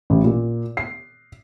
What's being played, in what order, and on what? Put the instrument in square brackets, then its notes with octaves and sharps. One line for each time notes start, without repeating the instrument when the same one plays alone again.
[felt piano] A1
A#2
C7